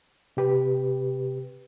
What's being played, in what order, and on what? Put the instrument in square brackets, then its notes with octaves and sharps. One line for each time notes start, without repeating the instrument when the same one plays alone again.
[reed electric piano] C3 G4 B4